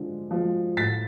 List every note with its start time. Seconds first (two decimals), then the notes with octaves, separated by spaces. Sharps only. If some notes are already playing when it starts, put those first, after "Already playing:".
Already playing: D3 F3 G#3
0.31 F3 G#3
0.77 A2 A6 B6